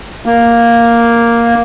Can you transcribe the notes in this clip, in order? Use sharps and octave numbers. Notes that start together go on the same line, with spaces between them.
A#3